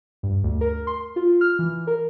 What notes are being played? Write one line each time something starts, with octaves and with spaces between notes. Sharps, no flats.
G2
D2
A#4
C6
F4
F6
E3
A#4